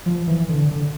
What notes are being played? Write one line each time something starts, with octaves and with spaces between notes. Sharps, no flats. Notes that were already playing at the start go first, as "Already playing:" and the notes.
F3
E3
D3
D3